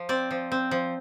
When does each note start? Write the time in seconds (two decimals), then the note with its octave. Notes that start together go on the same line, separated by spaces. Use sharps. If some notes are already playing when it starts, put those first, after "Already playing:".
Already playing: F3
0.09 C4 D5
0.31 F3
0.52 C4
0.71 F3